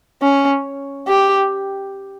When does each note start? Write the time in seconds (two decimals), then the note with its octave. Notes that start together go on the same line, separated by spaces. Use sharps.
0.22 C#4
1.08 G4